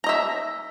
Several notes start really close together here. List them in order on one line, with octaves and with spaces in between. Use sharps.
A#5 D#5 E5